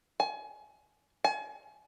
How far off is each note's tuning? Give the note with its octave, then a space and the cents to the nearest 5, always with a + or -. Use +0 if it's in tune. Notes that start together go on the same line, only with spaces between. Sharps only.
G#5 +30
G#5 +40